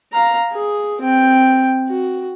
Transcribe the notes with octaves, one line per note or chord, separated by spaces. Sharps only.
F5 A#5
G#4
C4 G5
F#4